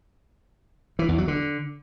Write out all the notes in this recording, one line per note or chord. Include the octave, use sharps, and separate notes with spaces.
E3
E2
F#3
D3